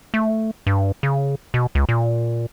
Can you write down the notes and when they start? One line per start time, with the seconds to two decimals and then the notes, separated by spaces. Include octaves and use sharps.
0.14 A3
0.67 G2
1.03 C#3
1.54 B2
1.75 C#2
1.89 A#2